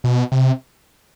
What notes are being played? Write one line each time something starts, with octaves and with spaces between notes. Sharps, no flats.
B2
C3